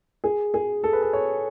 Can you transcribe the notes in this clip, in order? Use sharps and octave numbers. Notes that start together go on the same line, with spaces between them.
G#4
G#4
A4
B4
A4
C#5